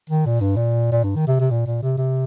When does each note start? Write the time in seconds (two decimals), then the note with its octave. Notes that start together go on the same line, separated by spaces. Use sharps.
0.10 D#3
0.25 A#2
0.41 G2
0.56 A#2
0.92 A#2
1.04 G2
1.16 D#3
1.27 C3
1.40 C3
1.51 A#2
1.66 A#2
1.83 C3
1.98 C3